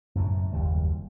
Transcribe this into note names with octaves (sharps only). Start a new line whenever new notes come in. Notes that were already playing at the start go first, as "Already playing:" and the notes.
F#2 A2 C#3
F#1 D#2 G3